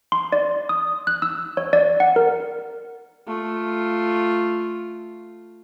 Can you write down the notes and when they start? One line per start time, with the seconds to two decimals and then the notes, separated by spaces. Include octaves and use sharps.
0.12 C6
0.32 D5
0.69 D#6
1.07 F#6
1.22 E6
1.57 C#5
1.73 D5
2.00 F#5
2.16 A#4
3.27 A3 F4